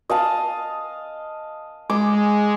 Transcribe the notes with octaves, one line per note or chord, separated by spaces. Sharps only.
D#5 F5 A5
G#3 D6